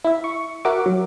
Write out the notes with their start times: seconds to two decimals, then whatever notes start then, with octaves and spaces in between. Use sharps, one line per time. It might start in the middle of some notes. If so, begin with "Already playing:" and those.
0.04 E4 E5
0.24 C#6
0.65 F#4 A#4 E5 F#5 D6
0.86 F#3